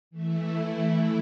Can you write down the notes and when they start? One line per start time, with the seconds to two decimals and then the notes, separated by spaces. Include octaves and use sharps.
0.11 E3 A3 E4